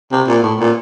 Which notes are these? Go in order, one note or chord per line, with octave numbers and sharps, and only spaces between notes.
C3
A#2
A2
A#2